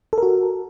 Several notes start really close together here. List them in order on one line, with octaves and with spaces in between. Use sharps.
A4 A#4 F#4